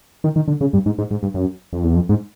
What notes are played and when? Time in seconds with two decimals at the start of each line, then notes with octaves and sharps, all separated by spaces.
0.24 D#3
0.36 D#3
0.48 D3
0.61 C#3
0.73 G2
0.86 G#2
0.98 G#2
1.11 G#2
1.23 G2
1.34 F#2
1.73 F2
1.84 E2
1.95 F2
2.09 G#2